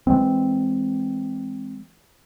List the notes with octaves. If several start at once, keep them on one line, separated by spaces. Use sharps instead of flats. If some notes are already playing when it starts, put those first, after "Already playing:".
E3 G#3 C4